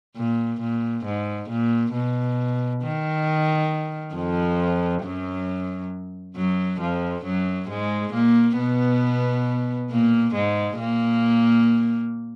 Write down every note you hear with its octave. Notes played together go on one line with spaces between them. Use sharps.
A#2
A#2
G#2
A#2
B2
D#3
F2 F3
F#2 F#3
F#2 F#3
F2 F3
F#2 F#3
G#2 G#3
A#2 A#3
B2 B3
A#2 A#3
G#2 G#3
A#2 A#3